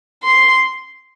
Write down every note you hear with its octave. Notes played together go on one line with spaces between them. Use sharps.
C6